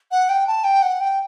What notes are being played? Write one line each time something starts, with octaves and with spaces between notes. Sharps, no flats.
F#5
G5
A5
G5
F#5
G5